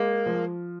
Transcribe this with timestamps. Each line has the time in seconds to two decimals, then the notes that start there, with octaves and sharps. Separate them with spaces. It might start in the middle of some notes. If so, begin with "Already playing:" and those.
Already playing: G#3 A#3
0.26 F3